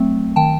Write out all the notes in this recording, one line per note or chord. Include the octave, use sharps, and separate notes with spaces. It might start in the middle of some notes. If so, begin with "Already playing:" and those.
Already playing: F#3 A3 C4
D#3 G5 A5